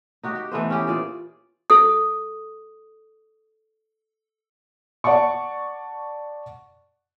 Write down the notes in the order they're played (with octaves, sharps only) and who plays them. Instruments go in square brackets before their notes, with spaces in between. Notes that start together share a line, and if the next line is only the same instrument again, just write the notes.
[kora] D#4 F#4 G4
G4
E3 A3 B3 C5
C#4 G4 G#4
A#2 G#4 D5
[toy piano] A4 D#6
[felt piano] D5 F#5 A5 C#6